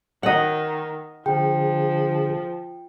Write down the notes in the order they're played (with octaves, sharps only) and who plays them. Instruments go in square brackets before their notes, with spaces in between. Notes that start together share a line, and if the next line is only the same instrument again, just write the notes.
[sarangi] D#3 [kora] D#5 F#5
[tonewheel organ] D3 G#4 [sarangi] F3 [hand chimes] G5